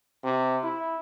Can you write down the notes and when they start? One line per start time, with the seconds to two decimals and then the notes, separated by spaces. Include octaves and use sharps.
0.24 C3
0.64 E4